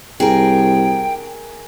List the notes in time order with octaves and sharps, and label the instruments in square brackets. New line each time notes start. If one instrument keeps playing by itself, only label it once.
[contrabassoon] C2 [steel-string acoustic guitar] G#4 A#4 [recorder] G5